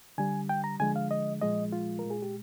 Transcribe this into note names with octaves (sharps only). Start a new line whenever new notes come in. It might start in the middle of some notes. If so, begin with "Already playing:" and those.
D3 G3 G#5
G5
A#5
D3 F3 G#3 G#5
F5
D#5
A#2 F3 G#3 D#5
F4
A#4
A#2 G#3
G#4
G4